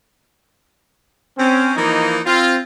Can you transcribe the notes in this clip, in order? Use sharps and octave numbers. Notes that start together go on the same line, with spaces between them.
C4 C#4
E3 F3 A#3 D#4
C4 F4